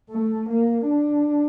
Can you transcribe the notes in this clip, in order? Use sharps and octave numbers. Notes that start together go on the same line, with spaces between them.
A3
A#3
D4